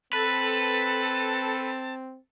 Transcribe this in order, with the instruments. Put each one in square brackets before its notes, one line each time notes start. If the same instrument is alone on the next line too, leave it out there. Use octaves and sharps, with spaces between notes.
[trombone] C4 [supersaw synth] A4 [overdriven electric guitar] B4 [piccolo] A5